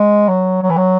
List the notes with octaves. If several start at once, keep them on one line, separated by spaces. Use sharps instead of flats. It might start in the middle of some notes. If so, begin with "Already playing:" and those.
Already playing: G#3
F#3
F#3
E3
F#3